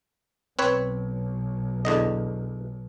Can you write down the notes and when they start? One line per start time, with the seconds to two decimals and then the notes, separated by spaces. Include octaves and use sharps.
0.59 B1 C4 B4 C#5
1.85 E2 D3 D#5